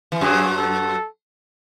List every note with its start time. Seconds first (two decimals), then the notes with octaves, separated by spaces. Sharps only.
0.12 E3
0.21 F#2 F#3 G#4
0.57 A4